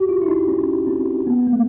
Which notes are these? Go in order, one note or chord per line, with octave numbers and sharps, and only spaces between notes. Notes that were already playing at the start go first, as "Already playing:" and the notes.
Already playing: F#4 G4
F4
E4
D#4
C#4
C4
B3
A#3
A3